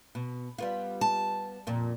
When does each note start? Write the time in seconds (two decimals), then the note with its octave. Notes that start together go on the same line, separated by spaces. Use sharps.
0.15 B2
0.58 G3 B3 F4
1.01 A5
1.67 F2 A#2